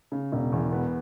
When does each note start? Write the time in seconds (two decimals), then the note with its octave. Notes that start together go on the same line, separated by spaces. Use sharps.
0.12 C#3
0.32 E1
0.52 E2
0.72 B3